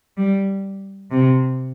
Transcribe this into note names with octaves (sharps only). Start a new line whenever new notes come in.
G3
C3